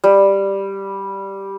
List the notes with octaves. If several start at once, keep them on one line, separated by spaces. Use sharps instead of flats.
G3